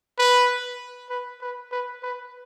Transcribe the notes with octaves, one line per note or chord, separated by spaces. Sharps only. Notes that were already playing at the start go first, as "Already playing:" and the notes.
B4
B4
B4
B4
B4